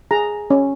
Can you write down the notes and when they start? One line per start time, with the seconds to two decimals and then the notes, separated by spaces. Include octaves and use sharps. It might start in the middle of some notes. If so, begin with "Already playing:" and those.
0.11 G#4 A#5
0.50 C#4